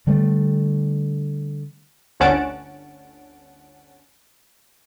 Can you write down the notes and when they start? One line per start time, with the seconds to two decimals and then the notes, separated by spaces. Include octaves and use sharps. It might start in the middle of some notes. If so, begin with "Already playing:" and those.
0.07 D3 G3 A3
2.20 G1 D2 C#4 F#5 A5 D7